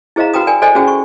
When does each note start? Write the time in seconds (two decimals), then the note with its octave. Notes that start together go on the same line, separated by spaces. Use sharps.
0.16 E4 G#4 C5 D#5 F5 A#5
0.33 F#4 B4 G5 A#5 D#6
0.47 A#4 D5 G5 G#5
0.62 A4 C5 D5 D#5 G#5
0.75 C#4 F#4 G#4 C5 G5
0.88 C#6